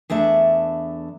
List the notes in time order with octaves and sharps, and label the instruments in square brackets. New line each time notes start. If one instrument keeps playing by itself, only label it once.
[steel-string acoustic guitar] E2 A3 D4 E5